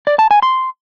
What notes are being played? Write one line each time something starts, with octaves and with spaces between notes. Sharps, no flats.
D5
A5
G#5
C6